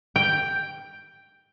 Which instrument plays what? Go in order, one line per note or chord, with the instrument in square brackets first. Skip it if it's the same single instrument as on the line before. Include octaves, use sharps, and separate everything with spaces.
[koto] G5